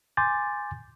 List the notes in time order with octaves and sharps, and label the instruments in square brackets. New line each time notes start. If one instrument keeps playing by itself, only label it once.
[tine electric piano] G#5 C6 D6 G6 A6